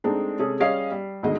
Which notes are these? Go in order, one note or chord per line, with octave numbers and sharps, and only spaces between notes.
G#3 A3 C4 D4 D#4
C3 G#3 C#4 G#4 A4
G3 C#4 G#4 D#5 F5 C7
G3
D2 B2 D3 D#3 G#3 D#5